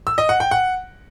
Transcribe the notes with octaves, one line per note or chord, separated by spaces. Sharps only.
E6
D#5
F#5
G5
F#5